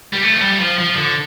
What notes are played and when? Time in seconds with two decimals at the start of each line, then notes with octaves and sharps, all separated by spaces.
0.13 G3
0.22 A3
0.32 F3
0.41 G3
0.60 F3
0.79 F3
0.96 D3